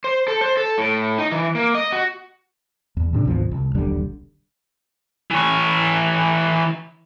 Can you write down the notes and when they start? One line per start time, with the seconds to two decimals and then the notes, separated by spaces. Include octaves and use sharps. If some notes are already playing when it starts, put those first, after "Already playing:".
0.04 C5
0.28 A4
0.41 C5
0.57 A4
0.78 A2
1.18 D#4
1.32 E3
1.55 A#3
1.75 D#5
1.92 F#4
2.97 E2
3.13 A2 C3 D4
3.25 G#1 D2 B2 F3
3.51 C2
3.75 D#1 B1 D3 G3
5.31 E3 C#5